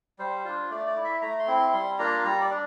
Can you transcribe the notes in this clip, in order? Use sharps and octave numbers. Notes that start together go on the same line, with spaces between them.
G3 C5
D4 F4
A3 D5
D5
E4
E5
A3 A#5
C6
C4 E4
C6
G3 C6
A#3 D4 F4 A#5
G3 A#5
D5
D4